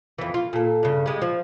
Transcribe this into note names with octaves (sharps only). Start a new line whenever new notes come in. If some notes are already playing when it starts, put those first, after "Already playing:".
F2 E3
F4
A#2 A4
G2 C#3
G3 G#3
F3